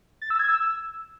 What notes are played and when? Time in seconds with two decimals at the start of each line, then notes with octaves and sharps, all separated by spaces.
0.22 A6
0.30 E6
0.39 G#6
0.48 E6